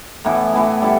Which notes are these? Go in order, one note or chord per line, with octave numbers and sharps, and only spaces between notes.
A2 E3 B3 E4
A2 E3 B3 E4
G3 E4 A4